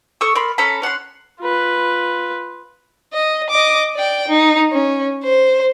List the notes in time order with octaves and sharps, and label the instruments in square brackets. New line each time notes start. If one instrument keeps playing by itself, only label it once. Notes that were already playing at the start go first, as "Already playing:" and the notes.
[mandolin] A4 C#6 D#6 E6
A#4 D5 B5 C6
C#4 A4 A#5 B5
C#4 F#5 A5 C6
[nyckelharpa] F4 B4
[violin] D#5
D#5 D6
D5 G5
D#4
C#4
C5